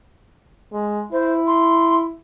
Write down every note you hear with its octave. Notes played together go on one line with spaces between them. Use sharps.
G#3
E4 C5
C6